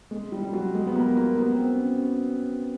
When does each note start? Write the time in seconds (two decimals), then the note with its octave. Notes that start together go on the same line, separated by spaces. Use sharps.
0.11 G#3
0.32 G3
0.44 G3
0.53 F#3
0.75 G#3
0.87 B3
0.96 A#3
1.17 A#3
1.38 B3
1.54 C4
1.70 C#4
1.86 C#4